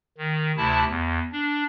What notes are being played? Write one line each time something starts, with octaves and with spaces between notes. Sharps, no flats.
D#3
D2 C3 E4 A5
E2
D4